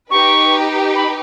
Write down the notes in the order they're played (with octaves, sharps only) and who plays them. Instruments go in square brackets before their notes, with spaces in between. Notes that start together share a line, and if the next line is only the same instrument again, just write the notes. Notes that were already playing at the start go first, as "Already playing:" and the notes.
[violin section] D#4 G4 B4 [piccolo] C#6
[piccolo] B5